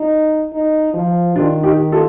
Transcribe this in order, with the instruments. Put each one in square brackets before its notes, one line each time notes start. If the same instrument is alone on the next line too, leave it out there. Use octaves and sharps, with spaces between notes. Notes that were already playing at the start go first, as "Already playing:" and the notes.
Already playing: [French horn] D#4
D#4
F3
[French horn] D#3 [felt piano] D4 F4
[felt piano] D#4 G4
F4 A4